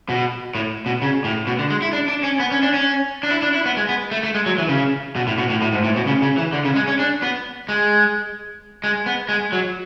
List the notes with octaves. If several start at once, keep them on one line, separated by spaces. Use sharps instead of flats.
B2
A2
B2
C#3
A2
B2
D3
G#3
E4
D4
D4
C#4
B3
C#4
D4
C#4
D4
E4
D4
E4
B3
G#3
B3
A3
A3
G#3
F#3
E3
C#3
B2
A2
B2
A2
A2
G#2
A2
B2
C#3
C#3
E3
D3
C#3
G#3
C#4
D4
B3
G#3
G#3
B3
G#3
F#3